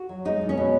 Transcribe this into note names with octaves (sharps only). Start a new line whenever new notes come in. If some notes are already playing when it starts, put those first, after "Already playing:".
Already playing: F#4
F#3
G#3 D#4
B2
C#4
B2